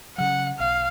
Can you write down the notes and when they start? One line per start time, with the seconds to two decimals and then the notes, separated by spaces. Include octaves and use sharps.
0.18 C#3 F#3 F#5
0.59 B1 F5